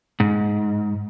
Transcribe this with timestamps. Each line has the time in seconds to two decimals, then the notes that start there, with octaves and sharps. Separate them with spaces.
0.20 G#2